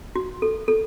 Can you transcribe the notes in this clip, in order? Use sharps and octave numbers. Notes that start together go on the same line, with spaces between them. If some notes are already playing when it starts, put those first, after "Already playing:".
F#4
A4
A4